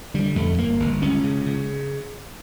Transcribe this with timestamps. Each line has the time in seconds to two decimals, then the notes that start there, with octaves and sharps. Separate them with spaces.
0.14 D3 G3
0.36 F2 A3
0.58 G1 A#3
0.80 G1
1.02 C#2 C#4
1.24 C#3
1.46 C#3